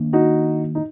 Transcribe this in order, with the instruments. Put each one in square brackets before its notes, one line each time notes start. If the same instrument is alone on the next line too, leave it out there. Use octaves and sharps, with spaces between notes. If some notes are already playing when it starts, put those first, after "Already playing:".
Already playing: [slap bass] D#3 A#3 D4
[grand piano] D#4 F#4
D#4